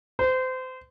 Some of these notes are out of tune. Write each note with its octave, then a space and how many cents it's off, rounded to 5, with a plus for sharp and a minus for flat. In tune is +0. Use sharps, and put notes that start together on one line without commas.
C5 -30